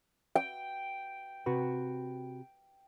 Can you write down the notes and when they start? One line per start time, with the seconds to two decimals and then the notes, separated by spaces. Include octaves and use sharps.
0.35 G5
1.46 C3 F#4 B4